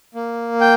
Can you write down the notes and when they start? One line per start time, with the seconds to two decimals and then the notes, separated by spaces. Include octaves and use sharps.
0.15 A#3
0.61 G5